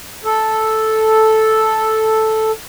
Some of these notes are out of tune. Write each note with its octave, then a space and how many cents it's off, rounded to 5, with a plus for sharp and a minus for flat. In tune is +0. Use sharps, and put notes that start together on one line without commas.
A4 -5